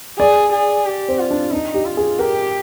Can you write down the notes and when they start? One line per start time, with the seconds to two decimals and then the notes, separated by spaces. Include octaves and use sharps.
0.19 G#4 D5
0.52 G#4
0.86 G4
1.08 C4
1.19 F4
1.31 D4
1.53 D4 D#4
1.74 G4
1.86 F4
1.97 G#4
2.19 G4 A#4